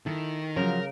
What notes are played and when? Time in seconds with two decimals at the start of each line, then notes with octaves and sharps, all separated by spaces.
0.06 D#3 E4 A4
0.56 C#3 F3 F#3 A#3 A#4